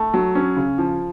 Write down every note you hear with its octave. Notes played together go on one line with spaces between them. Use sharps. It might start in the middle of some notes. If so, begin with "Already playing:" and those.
Already playing: A3
F#3
C#4
C#3
F3